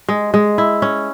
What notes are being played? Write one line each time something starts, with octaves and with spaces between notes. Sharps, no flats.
G#3
G#3
E4
C#4